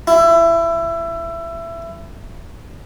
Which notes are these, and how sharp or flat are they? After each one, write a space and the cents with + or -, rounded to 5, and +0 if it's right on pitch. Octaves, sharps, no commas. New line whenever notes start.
E4 +25